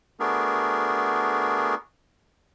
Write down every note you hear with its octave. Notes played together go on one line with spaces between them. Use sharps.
A3 B3 D4 F#4 G#4 A#4